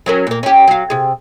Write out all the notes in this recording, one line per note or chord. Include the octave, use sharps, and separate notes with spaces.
F#3 C#4 A#4
A#2 A#3
C#4 G4
F#3 F5
C3 G#4